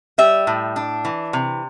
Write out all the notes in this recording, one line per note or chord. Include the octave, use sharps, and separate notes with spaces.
G3 E5
A2
D4
E3
C3